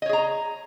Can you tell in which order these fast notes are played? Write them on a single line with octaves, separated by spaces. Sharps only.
D#5 C#5 G#4 A#5